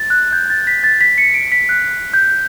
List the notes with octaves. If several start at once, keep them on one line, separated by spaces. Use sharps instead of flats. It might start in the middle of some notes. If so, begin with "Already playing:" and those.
Already playing: A6
F#6
G6
A6
B6
A6
B6
C#7
D7
B6
F#6
G6